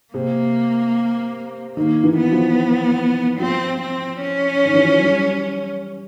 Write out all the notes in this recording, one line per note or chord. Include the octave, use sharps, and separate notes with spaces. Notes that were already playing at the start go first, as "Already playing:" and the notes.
C3 A#3
D#3 A#3
E3
B3
F3
F3 C4
C4
C#4
D#3
E3
F3
F#3
G3